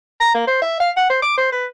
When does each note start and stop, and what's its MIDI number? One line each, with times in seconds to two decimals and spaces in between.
0.20 0.32 82
0.34 0.46 58
0.47 0.61 72
0.62 0.77 76
0.80 0.90 77
0.96 1.06 78
1.10 1.19 72
1.22 1.36 86
1.37 1.49 72
1.52 1.66 71